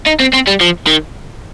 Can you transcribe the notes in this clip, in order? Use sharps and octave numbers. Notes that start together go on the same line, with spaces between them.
D#4
C4
C4
G3
F3
D#3